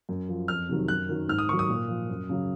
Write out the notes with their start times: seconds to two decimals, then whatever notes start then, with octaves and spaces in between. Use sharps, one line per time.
0.09 F#2
0.29 F3
0.48 F2 F6
0.69 C3 D#3 F#3
0.88 F#2 F#6
1.09 D#3 F#3
1.29 G#2 F6
1.38 D#6
1.49 D#3 F#3 C#6
1.59 D#6
1.69 A#2
1.89 F3
2.10 F#2
2.29 C#3 F#3